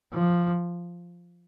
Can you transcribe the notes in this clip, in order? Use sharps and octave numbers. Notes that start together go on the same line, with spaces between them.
F3